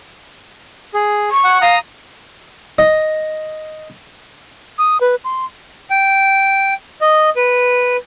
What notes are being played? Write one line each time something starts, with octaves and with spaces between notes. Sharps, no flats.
G#4
C#6
F#5
F5 A#5 D#6
D#5
D#6
B4
C6
G5
D#5
B4